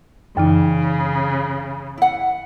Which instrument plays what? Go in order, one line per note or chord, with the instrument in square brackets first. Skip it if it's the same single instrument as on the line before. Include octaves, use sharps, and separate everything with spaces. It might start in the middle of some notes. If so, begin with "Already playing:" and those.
[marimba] F#2 E3 D#4 [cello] C#3
[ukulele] E4 F#5